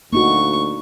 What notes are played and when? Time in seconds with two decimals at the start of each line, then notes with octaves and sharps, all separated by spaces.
0.13 D2 A#3 D#4 F#4 C#6